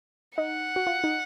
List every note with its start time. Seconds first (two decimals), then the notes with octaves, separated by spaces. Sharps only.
0.37 D#4 F#5
0.76 F#4
0.87 F4
1.04 D#4